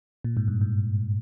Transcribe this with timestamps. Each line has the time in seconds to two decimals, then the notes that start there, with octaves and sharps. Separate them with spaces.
0.24 A#2
0.37 G#2
0.48 G2
0.61 G#2